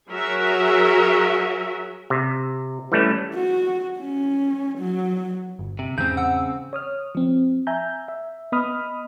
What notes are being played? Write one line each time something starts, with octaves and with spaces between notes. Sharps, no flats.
F#3 F#4 G#4 A#4 E5
C3
E3 G3 A3 C#4
F#4
C#4
F#3
G1
C3
E2 G#2 C#3 C4 G6
F#5 E6
C#5 D#6 F6
F3 C4
E5 G#5 A#5 G6
E5
B3 D#5 B5 D#6 F6